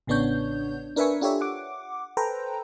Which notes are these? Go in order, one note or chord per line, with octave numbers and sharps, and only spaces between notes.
A1 C#3 B3 D4 C#5 G6
D4 A#4 B4 E5 G#5 C#6
D4 F4 G4 A4 C#5 E5
F#5 D6
A4 B4 C5 G5 A#5